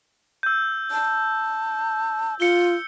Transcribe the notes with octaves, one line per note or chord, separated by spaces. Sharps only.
E6 G6
A5
F4 C#7 G7